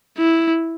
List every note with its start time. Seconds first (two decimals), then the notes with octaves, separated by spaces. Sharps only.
0.18 E4